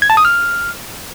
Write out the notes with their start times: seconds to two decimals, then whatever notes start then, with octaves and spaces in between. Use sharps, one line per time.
0.02 G#6
0.10 A5
0.17 D#6
0.25 F6